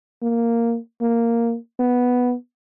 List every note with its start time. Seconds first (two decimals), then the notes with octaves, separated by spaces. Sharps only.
0.22 A#3
1.01 A#3
1.79 B3